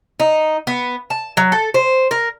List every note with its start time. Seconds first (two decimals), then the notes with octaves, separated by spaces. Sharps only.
0.20 D#4
0.67 B3
1.10 A5
1.37 F#3
1.52 A4
1.74 C5
2.11 A#4